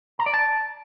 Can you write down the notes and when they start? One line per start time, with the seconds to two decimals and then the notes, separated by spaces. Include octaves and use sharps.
0.19 A#5
0.26 D5
0.34 A5